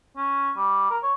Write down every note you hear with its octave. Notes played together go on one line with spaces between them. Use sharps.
C#4
G3
A#4
C#5